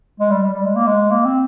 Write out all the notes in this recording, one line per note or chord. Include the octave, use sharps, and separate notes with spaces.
G#3
G3
G3
G3
G#3
A#3
G#3
A#3
C4